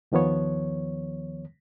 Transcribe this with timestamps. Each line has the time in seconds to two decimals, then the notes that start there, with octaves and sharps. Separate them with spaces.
0.12 D#2 D#3 F3 B3 C#5